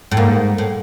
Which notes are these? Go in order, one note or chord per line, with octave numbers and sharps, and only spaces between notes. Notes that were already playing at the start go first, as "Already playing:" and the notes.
A2
G#2 A#3
A2